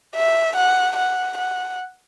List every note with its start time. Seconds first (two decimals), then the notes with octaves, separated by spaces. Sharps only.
0.16 E5
0.56 F#5
0.97 F#5
1.38 F#5